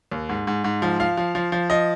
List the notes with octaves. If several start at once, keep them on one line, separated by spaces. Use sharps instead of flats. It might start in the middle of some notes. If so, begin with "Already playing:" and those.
D#2
G#2
G#2
G#2
F3
F3 F5
F3
F3
F3
F3 D#5